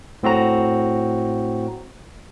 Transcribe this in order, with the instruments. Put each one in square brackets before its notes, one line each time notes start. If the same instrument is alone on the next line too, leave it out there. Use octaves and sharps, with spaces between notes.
[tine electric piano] A2 C4 F#4 A#5